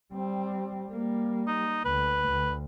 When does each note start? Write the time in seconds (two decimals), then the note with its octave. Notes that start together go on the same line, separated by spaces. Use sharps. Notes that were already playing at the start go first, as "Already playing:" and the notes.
0.13 G3 C4
0.89 G3 A#3
1.48 D#4
1.85 D2 B4
2.28 D2